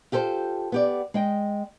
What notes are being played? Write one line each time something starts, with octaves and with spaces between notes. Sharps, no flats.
F4 G4 A4 C5
B3 G4 D5
G#3 D#5 G5